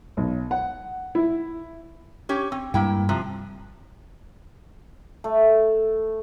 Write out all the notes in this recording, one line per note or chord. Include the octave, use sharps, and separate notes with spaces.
B1
F#5
E4
C#4 G4 C#5
C4
G2 G3 G#3 A#3 E4 G5
C3 F3
A3